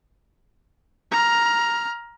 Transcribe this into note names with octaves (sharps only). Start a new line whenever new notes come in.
A#5 F6